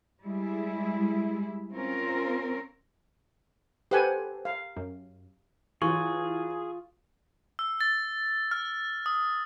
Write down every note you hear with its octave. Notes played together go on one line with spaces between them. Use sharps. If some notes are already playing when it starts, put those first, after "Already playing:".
G3 G#3 E4 G#4
C4 C#4 F4 A#4
G4 A4 B4 C5 F#5 G#5
F5
F#2
E3 F#3 F4 G#4 C#6
E6
A6
F6
D#6